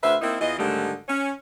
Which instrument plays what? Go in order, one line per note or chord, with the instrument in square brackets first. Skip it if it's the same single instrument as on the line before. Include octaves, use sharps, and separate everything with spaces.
[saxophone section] D2 B4 C5 E5
A#3 C4 D#4 E4
E2 E3 F4 D#5
G#2 D3 D#3 G3 A3 G4
C#4